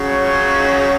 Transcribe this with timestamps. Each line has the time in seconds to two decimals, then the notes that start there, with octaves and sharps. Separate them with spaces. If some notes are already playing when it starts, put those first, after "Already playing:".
Already playing: C#3 F#3 C#4
0.21 F4
0.56 D#4